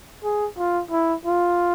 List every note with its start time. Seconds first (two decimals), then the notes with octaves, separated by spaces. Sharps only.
0.24 G#4
0.58 F4
0.91 E4
1.26 F4